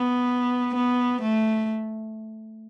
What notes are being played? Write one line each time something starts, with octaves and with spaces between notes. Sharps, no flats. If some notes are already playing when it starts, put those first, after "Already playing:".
Already playing: B3
B3
A3